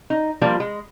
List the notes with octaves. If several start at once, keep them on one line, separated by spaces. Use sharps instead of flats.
D#4
F3 G3 A#3 D4 F4
G#3